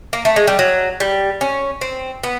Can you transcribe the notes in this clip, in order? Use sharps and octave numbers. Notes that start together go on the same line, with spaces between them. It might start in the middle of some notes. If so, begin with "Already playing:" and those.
A#3
A3
G#3
G3
F#3
G3
C#4
C4
B3